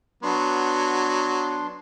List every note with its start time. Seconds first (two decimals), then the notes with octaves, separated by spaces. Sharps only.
0.23 F#3 B3 D4 C6